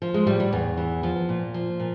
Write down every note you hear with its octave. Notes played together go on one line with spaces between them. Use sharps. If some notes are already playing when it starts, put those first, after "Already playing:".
F3
G#3
A2 G3
G3
E2
E3
F3
A#2
F3
A#2